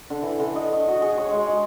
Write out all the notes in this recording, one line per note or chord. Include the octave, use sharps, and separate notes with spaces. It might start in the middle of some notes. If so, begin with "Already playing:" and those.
D3
E3
D3
D#5
C#6
F#4
G#4
C#5
G#3
G#4